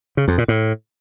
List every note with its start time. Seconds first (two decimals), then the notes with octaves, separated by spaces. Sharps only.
0.17 C#3
0.28 F2
0.38 A#2
0.48 A2